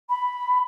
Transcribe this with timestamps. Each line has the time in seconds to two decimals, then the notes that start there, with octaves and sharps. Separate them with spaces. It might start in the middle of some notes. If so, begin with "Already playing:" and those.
0.09 B5